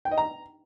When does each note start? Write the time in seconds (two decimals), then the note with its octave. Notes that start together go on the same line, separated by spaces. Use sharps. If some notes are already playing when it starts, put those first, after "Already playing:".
0.05 G5
0.11 D#5
0.18 A#5